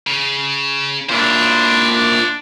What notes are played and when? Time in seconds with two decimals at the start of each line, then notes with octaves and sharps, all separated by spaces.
0.07 C#3
1.09 A#2 D4 E4 C5 D5
1.91 D4